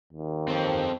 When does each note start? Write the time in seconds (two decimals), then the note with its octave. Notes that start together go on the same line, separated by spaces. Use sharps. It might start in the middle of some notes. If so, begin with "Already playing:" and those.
0.13 D#2
0.48 C4 A4